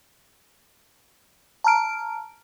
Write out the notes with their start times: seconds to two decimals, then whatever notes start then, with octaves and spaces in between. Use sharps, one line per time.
1.64 A5 A#5 F6 D7